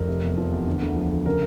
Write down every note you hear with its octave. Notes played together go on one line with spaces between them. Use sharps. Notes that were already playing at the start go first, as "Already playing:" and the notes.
Already playing: F1 A#4
C3
E2
F3
E2
D3
D2
F3
D2
C#3 A#4